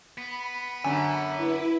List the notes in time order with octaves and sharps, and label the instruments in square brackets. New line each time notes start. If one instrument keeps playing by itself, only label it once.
[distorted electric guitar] B3 [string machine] B5
[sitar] F#2 D3 [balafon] G#5
[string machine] E4 B4